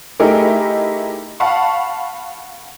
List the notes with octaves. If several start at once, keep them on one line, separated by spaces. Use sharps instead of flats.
A3 D#4 E4 G4 G#4 A#4
F5 F#5 A5 B5 C#6